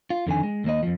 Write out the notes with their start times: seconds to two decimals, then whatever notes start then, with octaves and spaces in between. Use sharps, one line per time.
0.10 F4
0.27 F2 D3 D#3 G#5
0.43 G#3
0.64 D#2 A#3 D#5
0.83 F2 F3